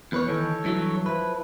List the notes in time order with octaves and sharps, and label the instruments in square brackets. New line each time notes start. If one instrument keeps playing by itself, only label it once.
[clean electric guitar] E2 B4 C#5
[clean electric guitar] D#3 E3 [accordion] A4 C#5 C#6
[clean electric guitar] G2 E3 F#3
[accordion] F3 E4 [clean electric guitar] B4